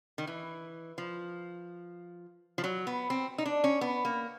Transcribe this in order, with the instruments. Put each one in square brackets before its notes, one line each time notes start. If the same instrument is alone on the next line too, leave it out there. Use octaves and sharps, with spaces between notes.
[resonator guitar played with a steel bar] D#3
E3
F3
F3
F#3
B3
C4
D#4
D4
C#4
B3
A#3